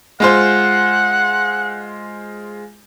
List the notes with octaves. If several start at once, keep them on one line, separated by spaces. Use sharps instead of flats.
G#3 F4 C5 F#5